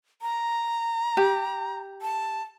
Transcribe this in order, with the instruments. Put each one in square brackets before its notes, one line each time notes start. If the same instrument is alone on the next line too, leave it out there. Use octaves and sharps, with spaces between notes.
[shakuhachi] A#5
[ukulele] G4
[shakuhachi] A5